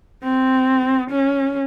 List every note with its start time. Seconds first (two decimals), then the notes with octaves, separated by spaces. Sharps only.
0.23 C4
1.10 C#4